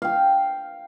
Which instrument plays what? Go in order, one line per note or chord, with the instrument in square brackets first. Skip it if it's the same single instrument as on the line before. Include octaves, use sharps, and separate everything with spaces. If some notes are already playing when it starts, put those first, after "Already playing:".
[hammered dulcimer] F5 G5